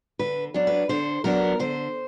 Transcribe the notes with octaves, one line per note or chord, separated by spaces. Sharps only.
D3 B4
F#3 B3 D4
B4
D3 C5
F#3 B3 D4 A#4
D3 C5